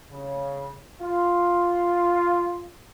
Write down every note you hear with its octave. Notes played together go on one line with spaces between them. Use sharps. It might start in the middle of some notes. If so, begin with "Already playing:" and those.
C#3
F4